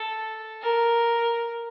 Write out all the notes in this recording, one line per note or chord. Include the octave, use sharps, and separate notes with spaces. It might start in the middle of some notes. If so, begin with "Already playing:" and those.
Already playing: A4
A#4